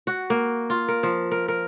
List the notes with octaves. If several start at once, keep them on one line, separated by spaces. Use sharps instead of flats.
F#4
A#3
F4
A#4
F3
A#4
A#4